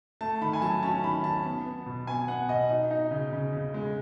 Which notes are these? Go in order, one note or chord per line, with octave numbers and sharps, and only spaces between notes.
A3 A5
D#3 B5
G#5
F#3 A5
C#4 A5
D#3 B5
D#3 A5
B3
B3
B2
B3 G#5
B3 F#5
B2 D#5
D#4
D#4
C#3
C#3
C#3
G#3